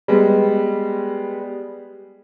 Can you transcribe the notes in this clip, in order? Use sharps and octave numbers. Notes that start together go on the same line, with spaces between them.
G3 G#3 B3